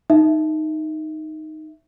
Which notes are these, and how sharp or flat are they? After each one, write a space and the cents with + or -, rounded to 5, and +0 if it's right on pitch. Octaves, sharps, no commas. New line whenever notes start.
D#4 +0 E5 +0